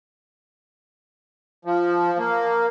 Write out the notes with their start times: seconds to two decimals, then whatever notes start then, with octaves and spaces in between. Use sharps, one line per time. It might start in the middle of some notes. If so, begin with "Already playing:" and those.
1.65 F3
2.18 A#3